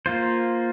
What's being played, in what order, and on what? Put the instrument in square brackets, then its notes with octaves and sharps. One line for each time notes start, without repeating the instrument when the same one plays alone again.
[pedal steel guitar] A#3 F4 C5